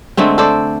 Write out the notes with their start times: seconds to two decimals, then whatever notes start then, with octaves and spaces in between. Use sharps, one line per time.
0.17 D3 G#3 A3 C4
0.38 A4 C5 D5